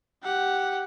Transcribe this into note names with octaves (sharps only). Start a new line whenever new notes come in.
G4 F#5